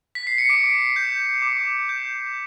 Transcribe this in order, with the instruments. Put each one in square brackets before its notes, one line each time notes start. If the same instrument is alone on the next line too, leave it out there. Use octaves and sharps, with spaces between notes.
[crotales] B6
C7
C#7
D6 D7
G6
D6
G6